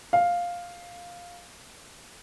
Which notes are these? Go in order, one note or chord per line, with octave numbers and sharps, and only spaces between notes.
F5